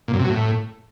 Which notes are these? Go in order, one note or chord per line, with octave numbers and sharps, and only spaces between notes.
A#2
F#2
C3
F#3
A2